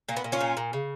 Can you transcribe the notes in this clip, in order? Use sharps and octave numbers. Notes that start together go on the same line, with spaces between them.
A#2 A#3
B3
A#2
C#4 F4
A#2
A#2
C#3